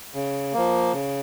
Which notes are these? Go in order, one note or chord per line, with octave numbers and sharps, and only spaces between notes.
C#3
F3 A#3
C#3